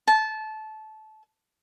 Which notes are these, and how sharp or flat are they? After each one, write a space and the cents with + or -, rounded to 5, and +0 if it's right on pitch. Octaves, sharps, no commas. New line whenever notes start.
A5 -20